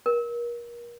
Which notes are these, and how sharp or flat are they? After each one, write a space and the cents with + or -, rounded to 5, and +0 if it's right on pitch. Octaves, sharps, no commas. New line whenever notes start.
A#4 +30